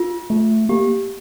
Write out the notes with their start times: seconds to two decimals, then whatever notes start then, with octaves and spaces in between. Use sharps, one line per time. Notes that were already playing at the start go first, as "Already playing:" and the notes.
Already playing: F4
0.30 A3
0.69 A#3 G4